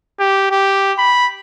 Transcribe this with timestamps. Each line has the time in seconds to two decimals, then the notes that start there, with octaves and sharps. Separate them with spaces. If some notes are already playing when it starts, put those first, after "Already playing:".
0.20 G4
0.51 G4
0.99 B5